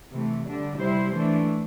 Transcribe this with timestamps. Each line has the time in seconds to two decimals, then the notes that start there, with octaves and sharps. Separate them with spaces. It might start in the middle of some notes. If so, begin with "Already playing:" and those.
0.13 C3 E3 A3
0.46 D3 G3 D4
0.79 C3 G3 E4 C5
1.13 E3 A3 D4